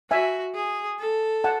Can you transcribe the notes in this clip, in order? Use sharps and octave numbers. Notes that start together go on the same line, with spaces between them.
F#4 E5 G#5
G#4
A4
F#5 A5